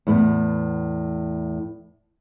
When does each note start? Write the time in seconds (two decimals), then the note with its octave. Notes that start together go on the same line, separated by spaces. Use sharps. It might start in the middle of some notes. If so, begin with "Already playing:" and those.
0.07 E2 A2 B3